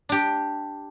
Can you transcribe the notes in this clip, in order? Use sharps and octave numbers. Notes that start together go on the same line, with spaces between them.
D4 G4